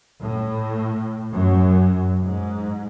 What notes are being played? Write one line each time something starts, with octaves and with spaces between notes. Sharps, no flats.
A2
F#2
G#2